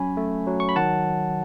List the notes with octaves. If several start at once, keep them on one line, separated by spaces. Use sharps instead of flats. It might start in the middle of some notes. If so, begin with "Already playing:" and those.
Already playing: F#3 C#4 G#5 B5
A3
F#3
C#6
B5
D#3 F#5 A5